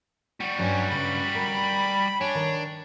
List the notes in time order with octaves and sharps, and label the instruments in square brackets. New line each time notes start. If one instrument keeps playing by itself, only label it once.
[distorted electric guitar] G3 F#4
[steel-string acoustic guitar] G2 F#3 D4 [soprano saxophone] C#4
[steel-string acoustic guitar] G2 C#3 [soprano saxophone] B5
[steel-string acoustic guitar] A#4
[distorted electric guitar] D4 [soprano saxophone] C#5 [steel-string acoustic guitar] G#5
[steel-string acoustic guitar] D#3